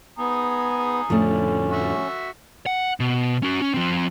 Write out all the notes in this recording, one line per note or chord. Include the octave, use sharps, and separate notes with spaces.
B3 G#5 A#5 D#6
F2 A2 D3 F3 A3 C#4
F#4 E5
F#5
B2
C#4 F#4
C#4
F3 C4